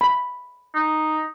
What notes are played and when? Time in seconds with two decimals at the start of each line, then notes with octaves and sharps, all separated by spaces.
0.01 B5
0.74 D#4